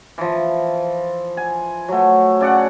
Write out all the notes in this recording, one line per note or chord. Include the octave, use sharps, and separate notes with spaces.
E3 F3
G#5
F#3 A3
C#3 D5 F#5